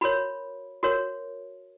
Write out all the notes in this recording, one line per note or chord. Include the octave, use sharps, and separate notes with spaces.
F#4 A#4 C#5 B5
F#4 A#4 C#5